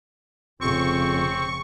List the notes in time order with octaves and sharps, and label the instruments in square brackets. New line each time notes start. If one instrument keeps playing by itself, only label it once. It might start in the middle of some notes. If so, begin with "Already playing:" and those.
[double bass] F1 C#3 [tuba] F2 [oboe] C4 [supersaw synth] C#6